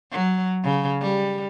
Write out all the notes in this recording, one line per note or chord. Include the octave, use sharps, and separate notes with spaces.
F#3
C#3
G3